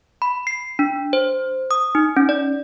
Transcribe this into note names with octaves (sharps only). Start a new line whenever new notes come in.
B5
C7
D4
C5
D#6
D#4
C#4
D5